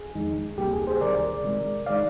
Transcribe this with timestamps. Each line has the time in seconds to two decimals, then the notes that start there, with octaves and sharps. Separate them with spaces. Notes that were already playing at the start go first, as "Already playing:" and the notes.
Already playing: G#4
0.15 F2 D#3 G#3 D#4
0.58 D2 C3 G3 A#3 G4
0.73 G#4
0.87 G#4 C5
1.00 D2 C3 D#3 G3 A#4 D5
1.44 C3 D#3 G#3
1.86 D#3 G#3 D#4 D5 F5